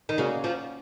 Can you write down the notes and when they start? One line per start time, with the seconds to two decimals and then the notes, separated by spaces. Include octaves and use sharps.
0.09 D#3
0.18 C#3 A#3 C#4 F#4
0.44 F3